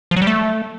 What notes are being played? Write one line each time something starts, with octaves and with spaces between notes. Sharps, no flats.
F3
F#3
G3
A3